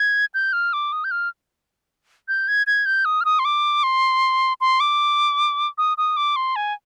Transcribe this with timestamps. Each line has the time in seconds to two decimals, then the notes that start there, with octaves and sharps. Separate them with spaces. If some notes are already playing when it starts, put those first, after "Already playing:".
Already playing: G#6
0.34 G6
0.53 F6
0.73 D6
0.93 D#6
1.04 G6
1.11 F6
2.28 G6
2.48 G#6
2.67 G#6
2.86 G6
3.05 D#6
3.21 F6
3.25 D#6
3.39 C6
3.45 D6
3.83 C6
4.61 C6
4.80 D6
5.78 D#6
5.98 D#6
6.17 D6
6.36 C6
6.56 G#5